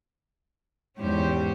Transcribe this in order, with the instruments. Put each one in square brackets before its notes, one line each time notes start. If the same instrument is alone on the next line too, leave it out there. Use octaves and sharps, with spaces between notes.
[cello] E2 G#2 [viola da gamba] C#4 G4 C5